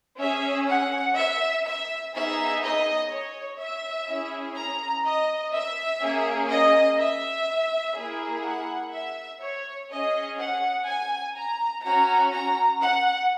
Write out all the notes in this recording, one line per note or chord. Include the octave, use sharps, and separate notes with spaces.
C#4 G#4 E5
F#5
E5
E5
B3 D#4 G#4 E5
D#5
C#5
E5
C#4 E4 G#4
A#5
D#5
E5
A#3 C#4 G#4
D#5
E5
A#3 E4 G#4
F#5
E5
C#5
C#4 G#4 D#5
F#5
G#5
A#5
C#4 F#4 A#5
A#5
F#5